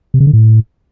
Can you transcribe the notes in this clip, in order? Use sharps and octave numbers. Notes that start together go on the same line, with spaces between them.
C3
C#3
D3
A2